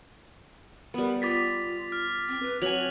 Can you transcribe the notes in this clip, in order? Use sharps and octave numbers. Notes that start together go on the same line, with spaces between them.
G3 B3 A#4
F4 D6 A6 B6
F6
C4
B4
F#3 C4 G#5 F7 F#7